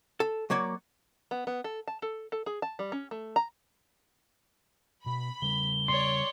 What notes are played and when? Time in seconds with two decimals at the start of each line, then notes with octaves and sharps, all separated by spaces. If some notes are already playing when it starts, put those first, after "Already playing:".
0.20 A4
0.50 F#3 A#3 C#5 D5
1.31 B3
1.47 B3
1.64 A4
1.88 A5
2.02 A4
2.32 A4
2.46 G#4
2.62 A5
2.79 G3
2.92 C#4
3.11 A3
3.36 A#5
5.06 B2 B5
5.42 C#3 G3 G7
5.88 C#5 D5 C6